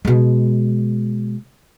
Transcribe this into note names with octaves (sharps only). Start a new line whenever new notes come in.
B2 G#3